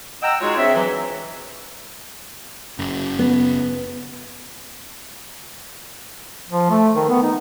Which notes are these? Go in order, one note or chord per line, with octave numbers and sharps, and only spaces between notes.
D#5 F#5 G5 A#5 E6
G#3 D#4 F4 F#4 G#4 C#5
C4 D4 G#4 C5 C#5 E5
E3 F#3
F#1 C#3
B3
F3
A3
D#3
B3
D#4